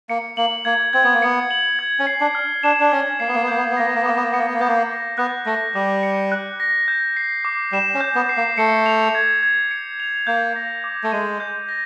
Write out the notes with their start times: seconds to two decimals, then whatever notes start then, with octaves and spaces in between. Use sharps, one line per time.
0.09 A#3 C#7
0.37 A#3 F#7
0.65 A#3 G#6
0.93 C4 G#6
1.04 B3
1.14 A#3
1.22 B3 C#7
1.51 F#7
1.79 G#6
1.99 C#4
2.07 C7
2.21 D4
2.35 F6
2.63 D4 E7
2.80 D4
2.92 C#4 G#6
3.20 A#3 C7
3.28 B3
3.35 A#3
3.42 B3
3.48 A#3 G6
3.57 B3
3.65 A#3
3.72 B3
3.77 A#3 A#6
3.86 B3
3.95 A#3
4.02 B3
4.06 A#3 D6
4.16 B3
4.23 A#3
4.32 B3 C#7
4.39 A#3
4.46 B3
4.53 A#3
4.60 B3 G6
4.68 A#3
4.90 A#6
5.18 B3 F#6
5.46 A3 A#6
5.75 G3 D6
6.03 C#7
6.32 F#6
6.60 A#6
6.88 G6
7.17 C7
7.45 D6
7.72 G3 E7
7.94 C#4
8.00 G6
8.15 B3
8.29 C7
8.37 A#3
8.58 A3 C#7
8.86 F7
9.15 G#6
9.43 G#6
9.71 C#7
10.00 F7
10.27 A#3 G6
10.56 A#6
10.84 D6
11.03 A3
11.12 G#3 D#7
11.40 G6
11.69 A#6